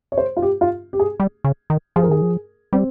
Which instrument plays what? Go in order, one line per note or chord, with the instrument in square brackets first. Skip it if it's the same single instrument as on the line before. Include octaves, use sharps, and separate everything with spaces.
[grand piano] C#5
C5
F4
G4
F4
G4
G#4
[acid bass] G3
C#3
D#3
[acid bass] F3 [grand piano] G#4
[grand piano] A#4
[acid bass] D#3 [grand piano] G#4
[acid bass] F3
[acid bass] G3 [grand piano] C4